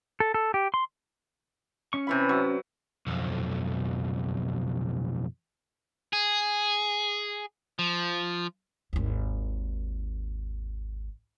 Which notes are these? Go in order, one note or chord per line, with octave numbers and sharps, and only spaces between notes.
A4
A4
G4
C6
C#4 C#6
C3 E3 B5
F#3
B1 F2
G#4
F3
G#1 D#2